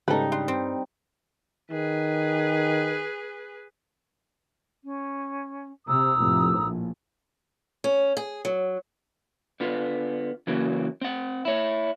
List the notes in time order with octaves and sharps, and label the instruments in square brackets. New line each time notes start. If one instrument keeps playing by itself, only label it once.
[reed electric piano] G#2 C#3 [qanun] G3 D#4 [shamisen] A4 B4
[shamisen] D4 [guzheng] C6
[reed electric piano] G2 [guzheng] C4
[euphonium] D#3 [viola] G#4 B4
[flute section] C#4
[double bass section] C3 [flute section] A#5 D#6 E6
[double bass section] F1 A2
A#1
[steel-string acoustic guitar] C#4
G#4
F#3
[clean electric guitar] D3 B3 F4
C#3 E3 F#3 A#3
C4 F#5
E4 C#5